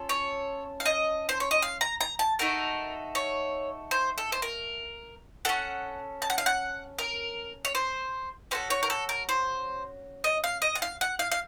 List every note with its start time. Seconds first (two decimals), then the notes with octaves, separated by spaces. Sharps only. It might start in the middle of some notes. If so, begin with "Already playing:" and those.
Already playing: C#4 F4 A4
0.09 C#5
0.80 F5
0.86 D#5
1.29 C5
1.40 C#5
1.51 D#5
1.62 F5
1.81 A#5
2.01 A#5
2.19 A5
2.39 A3 D#4 F#4 A4 A#4
3.15 C#5
3.91 C5
4.18 A4
4.32 C5
4.42 A#4
5.45 C#4 A4 F#5
6.22 A5
6.30 F#5
6.38 F5
6.46 F#5
6.99 A#4
7.65 C#5
7.75 C5
8.51 C#4 F#4 A4 C5
8.70 C#5
8.83 A#4
8.90 A4
9.09 A#4
9.29 C5
10.24 D#5
10.44 F5
10.62 D#5
10.75 F#5
10.82 F5
11.01 F#5
11.19 F5
11.31 F5